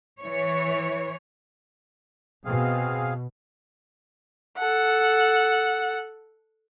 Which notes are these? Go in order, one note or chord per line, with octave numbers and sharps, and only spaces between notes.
E3 C#5
B2 C4 G#4 F5
A4 F#5